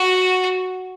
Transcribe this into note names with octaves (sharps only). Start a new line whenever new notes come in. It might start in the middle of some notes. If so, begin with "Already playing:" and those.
Already playing: F#4